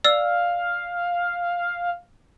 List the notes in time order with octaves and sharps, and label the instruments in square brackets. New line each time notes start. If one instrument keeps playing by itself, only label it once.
[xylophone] D5 E6 [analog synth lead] F5